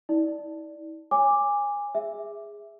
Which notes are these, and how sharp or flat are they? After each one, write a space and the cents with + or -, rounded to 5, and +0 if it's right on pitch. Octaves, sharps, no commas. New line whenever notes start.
E4 -45 D5 +0
C#5 +0 G#5 -20 D6 +0
G#4 -15 E5 +0